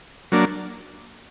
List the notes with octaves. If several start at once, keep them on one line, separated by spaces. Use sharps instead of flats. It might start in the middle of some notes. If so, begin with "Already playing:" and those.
F#3 A#3 D4